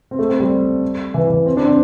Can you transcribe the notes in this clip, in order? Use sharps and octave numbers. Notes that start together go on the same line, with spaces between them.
C4
A3
C4
G3
E3
E3
C4
D4
C4